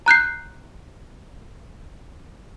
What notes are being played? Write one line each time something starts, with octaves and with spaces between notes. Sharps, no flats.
A#5 F#6 G6 C7